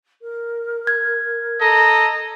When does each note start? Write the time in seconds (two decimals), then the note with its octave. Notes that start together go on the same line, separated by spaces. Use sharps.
0.21 A#4
0.87 G#6
1.61 A4 D#5 A#5